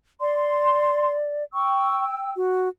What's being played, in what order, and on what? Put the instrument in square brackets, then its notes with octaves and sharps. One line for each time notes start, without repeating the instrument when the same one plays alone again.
[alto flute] D5 [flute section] C6
[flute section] G5 E6 [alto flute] C#6
[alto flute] F#4